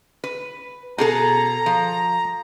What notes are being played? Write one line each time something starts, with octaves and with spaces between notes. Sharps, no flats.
B4
B2 G#4 A4 A#5
F3